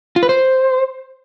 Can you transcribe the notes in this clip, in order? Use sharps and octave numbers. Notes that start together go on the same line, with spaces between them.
F4
B4
C5